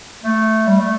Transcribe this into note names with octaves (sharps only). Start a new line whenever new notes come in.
A3
G3
A3